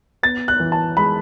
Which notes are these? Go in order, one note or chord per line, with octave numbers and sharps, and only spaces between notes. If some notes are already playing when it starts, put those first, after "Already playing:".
B3 A6
F#6
E3
A5
G#3 B5